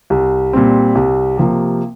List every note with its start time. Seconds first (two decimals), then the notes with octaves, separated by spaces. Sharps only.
0.10 C2
0.53 A#2 G3 C4
0.95 C2
1.37 C3 F3 A#3